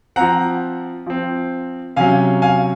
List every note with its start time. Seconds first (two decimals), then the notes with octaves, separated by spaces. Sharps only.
0.16 F3 C4 F#5 A#5
1.07 F3 C4
1.96 C3 F#3 C#4 F5 G#5
2.42 F5 G#5